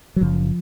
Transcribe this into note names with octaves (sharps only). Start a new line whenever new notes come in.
F#3
F#1 F#2 C#3 F3